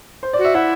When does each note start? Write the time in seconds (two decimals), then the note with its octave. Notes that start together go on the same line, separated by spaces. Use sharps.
0.23 C5
0.33 D5
0.39 F#4
0.45 E5
0.55 E4 F#5